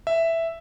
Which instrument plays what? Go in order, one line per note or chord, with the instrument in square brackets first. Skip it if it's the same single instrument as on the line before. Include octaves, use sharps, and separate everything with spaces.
[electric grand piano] E5